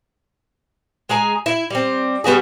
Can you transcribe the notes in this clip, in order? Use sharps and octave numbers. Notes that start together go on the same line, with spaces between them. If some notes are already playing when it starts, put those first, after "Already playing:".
G#3 G#4 G#5 A#5
E4
G3 C4
G3 B3 F#4 G#4